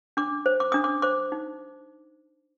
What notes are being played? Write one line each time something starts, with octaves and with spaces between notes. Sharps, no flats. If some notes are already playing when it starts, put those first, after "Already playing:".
D4 D6
C5
D6
D4 D#6
D6
C5 D6
D#4